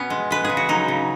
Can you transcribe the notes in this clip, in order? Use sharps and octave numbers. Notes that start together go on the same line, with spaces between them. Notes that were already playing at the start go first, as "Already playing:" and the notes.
Already playing: B2 B3 C#4
G#3
G#3 B4
C#3 G#4
F#4
F#3 D#4
C#3